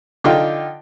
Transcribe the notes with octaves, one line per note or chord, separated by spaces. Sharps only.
D3 D#4 F4 G5